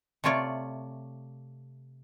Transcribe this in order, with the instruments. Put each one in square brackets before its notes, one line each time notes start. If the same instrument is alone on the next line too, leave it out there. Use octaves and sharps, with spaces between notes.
[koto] C3 A3 F4 C#5 D5